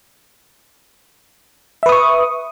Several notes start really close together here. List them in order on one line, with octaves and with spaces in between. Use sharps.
E5 B4 D#6 C#6